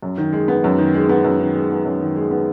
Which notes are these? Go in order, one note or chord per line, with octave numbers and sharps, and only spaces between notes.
F#2
D#3
G#3
B3
F#2
D#3
G#3
B3
F#2
D#3
G#3
B3
F#2
D#3
G#3
B3